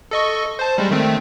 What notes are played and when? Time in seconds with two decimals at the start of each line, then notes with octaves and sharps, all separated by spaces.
0.11 A4 D#5 C#6
0.59 C5 A5
0.78 G3 G#3
0.91 D#3 A3 C4